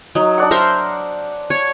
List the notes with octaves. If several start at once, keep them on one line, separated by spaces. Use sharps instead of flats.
F#3 D#4
D4 D5 F#5
A#4 C5 E5
C#5